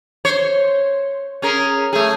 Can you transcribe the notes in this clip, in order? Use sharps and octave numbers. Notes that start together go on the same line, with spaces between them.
C5 C#5
C#4 G#4 A#4
A3 G#4